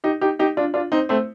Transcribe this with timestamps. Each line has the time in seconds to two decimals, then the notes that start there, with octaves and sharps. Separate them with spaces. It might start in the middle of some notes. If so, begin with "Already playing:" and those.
0.04 D#4 G4
0.21 D#4 G4
0.39 D#4 G4
0.57 D4 F4
0.74 D4 F4
0.92 C4 D#4
1.09 A3 C4